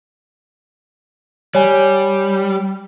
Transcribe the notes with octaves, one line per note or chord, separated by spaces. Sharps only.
G3 C#5 G#5